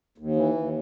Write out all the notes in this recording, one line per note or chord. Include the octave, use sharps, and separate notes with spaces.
D#2
E3
D#2